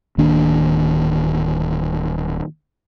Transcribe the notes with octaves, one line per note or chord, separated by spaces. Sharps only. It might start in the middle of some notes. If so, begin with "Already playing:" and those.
D1 D#3 A#3 D4